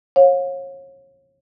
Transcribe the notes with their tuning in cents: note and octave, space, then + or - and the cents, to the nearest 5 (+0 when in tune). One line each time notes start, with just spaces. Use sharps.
C#5 -30 F5 +35